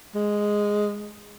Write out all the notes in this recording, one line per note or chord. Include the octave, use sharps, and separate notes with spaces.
G#3